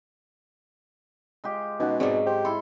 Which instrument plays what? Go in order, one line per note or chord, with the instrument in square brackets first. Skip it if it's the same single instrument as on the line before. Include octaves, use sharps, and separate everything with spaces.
[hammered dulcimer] G#3 F4 G4
[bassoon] B2 [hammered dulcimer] G#3 [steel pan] C#4 D#4 F#5
[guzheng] G#2 F#3 [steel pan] C4 G#4 D5
[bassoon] G4 [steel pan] C5
[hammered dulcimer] E4 C6 [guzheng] A4